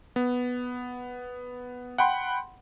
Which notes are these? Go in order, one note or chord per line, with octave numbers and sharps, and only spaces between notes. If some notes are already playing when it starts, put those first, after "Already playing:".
B3
F#5 G5 B5 C6